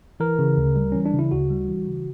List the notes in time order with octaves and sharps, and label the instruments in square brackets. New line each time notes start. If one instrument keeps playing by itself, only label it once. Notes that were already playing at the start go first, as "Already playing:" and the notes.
[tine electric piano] E3 A#4
C#3
D2
G3
E3 C#4
D4
C#3
E4
D2 F#4
G3
E3
C#3